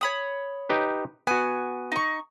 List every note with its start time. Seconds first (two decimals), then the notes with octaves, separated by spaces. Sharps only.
0.01 C#5 B5 D#6
0.69 D#4 G4 B4
1.27 B3 F#4 G#5
1.92 D#4 C#6